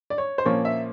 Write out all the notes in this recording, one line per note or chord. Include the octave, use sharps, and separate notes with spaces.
D5
C#5
C5
A#2 F3 A#3 C#4 C#5
E5